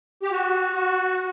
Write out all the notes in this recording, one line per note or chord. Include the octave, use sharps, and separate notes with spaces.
G4
F#4
F#4